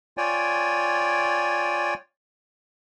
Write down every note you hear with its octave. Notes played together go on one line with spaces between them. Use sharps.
F4 C#5 D5 G5 G#5